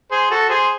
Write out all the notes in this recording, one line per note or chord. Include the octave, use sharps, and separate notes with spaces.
G#4 C5
F#4 A4
G#4 C5